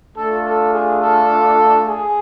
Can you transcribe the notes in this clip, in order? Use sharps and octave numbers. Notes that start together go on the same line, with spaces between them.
A3 D4 F4 A4
A4
G#4
A4
G#4